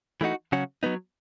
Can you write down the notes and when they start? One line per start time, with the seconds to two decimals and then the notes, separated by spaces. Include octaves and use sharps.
0.21 E3 A3 D#4 F#4
0.52 C#3 F#3 C#4 F#4
0.83 F#3 B3 D#4